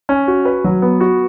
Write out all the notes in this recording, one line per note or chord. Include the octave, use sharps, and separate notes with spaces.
C#4
F#4
B4
F#3
B3
F#4